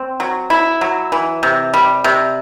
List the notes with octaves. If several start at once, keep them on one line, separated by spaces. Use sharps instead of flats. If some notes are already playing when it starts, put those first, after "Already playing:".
Already playing: C4
F#3
E4
F#3
E3
C3
G3
C3